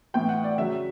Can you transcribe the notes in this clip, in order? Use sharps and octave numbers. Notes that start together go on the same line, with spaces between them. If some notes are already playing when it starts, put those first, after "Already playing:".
A2 E3 G5
F#5
D5
C#3 F#3 E5